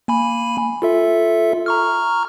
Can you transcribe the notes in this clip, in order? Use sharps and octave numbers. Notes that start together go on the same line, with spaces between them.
A#3 G#5 B5
F4 A4 E5
A#5 C#6 F6